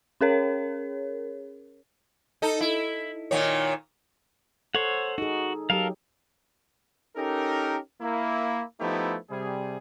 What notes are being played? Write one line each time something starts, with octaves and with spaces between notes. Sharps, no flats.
C#4 G#4 A#4 C#5
D#4 A4
E4
A#2 D#3 C#5
A4 C5 C#5 F#5
D#4 F#4 G#4
F#3 G4 A4 A#4 F5
C#4 D#4 G4 A4 A#4
A#3 E4
F3 A3 B3 D#4 E4 G4
C3 G3 G#4